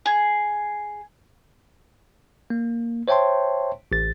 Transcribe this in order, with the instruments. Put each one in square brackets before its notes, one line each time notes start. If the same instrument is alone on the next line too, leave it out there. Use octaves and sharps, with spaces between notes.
[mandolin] G#4
[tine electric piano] A#3
C5 C#5 E5 G5 A5 C6
A1 A6